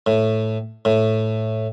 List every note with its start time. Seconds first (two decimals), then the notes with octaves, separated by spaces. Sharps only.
0.06 A2
0.85 A2